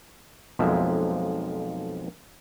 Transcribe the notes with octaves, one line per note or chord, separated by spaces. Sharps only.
B1 F2 F3 G#3 A#3 E5